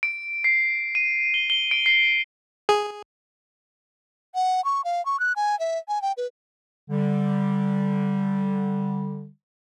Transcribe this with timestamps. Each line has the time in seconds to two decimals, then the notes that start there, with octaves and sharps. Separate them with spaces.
0.03 D7
0.44 C7
0.95 D#7
1.34 G7
1.50 G7
1.71 D7
1.86 C7
2.69 G#4
4.35 F#5
4.65 C#6
4.85 F5
5.06 C#6
5.20 F#6
5.36 G#5
5.60 E5
5.88 G#5
6.02 G5
6.17 B4
6.89 D3 G3